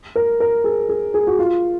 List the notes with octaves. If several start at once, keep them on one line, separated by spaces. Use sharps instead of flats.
A#4
A#4
G#4
G#4
G#4
F#4
F4